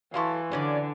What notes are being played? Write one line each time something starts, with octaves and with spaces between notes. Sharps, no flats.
E3 F#3 E4 A4 F5 C6 C#6
D3 F#3 C#4 D5